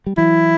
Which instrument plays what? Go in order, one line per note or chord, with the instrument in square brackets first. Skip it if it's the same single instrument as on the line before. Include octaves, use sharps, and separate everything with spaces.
[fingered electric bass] G3
[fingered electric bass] E3 F#3 [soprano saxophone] E4